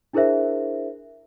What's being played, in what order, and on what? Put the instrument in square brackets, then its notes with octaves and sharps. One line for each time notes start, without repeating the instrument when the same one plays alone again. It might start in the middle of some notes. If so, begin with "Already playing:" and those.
[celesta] D4 E4 G#4 A#4 C5 E5